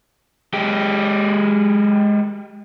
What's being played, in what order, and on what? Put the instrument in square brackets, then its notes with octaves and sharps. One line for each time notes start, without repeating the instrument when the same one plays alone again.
[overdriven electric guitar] G#3 G4